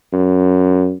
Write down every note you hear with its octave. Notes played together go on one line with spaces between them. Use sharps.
F#2